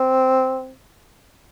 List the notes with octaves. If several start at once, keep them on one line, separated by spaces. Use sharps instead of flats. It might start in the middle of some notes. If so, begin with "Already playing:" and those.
Already playing: C4